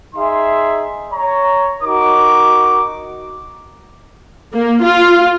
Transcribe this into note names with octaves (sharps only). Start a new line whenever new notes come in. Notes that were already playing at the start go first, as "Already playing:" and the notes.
D#4 G#4 E5 C6
C#5 A#5
D#4 F#4 A#4 D6
A#3
F4